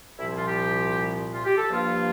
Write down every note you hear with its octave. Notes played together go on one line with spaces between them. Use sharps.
C2 A#2 F3 E4
F4
G4
F4
G4
A4
G2 F3 A#3 F4